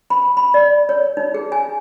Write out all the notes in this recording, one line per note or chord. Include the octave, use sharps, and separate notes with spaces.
B5
B5
D5
C#5
D#4
G#4
G#5